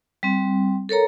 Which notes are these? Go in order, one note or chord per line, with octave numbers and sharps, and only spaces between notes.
G3 C4
A4 A#4 C#5 A#5